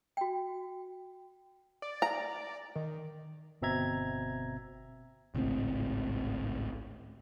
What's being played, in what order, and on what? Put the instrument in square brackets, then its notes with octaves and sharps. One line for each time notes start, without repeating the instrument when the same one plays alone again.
[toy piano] F#4 G5
[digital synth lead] D5
[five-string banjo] A#5
[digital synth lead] D#3
[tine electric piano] G1 B2 C4 E5 A#5 G#6
[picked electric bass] G#1 C#2 A2 C4